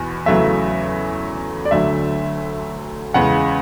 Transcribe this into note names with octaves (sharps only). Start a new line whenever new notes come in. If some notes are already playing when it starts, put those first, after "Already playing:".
Already playing: E2 B2
E2 C#3 F#3 A3 E5
D5
D2 D3 F#3 A3 E5
E2 C#3 G#3 F#5